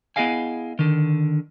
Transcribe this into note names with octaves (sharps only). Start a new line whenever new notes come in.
B3 E4 G#4 D#5 F5 G#5
D3 D#3